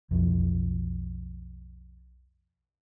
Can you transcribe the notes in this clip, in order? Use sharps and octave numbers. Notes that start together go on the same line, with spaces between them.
B1 F2 F3